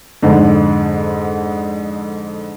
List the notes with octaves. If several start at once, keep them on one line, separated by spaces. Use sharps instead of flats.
F2 G#2 D3